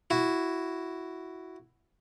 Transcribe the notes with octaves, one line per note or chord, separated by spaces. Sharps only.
E4 F#4